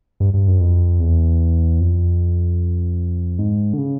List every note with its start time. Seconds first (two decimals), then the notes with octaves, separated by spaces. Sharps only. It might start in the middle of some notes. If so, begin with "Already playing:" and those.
0.20 G2
0.34 G2
0.47 F#2
0.60 F2
0.99 E2
1.80 F2
3.39 G#2
3.73 D3
3.78 C#3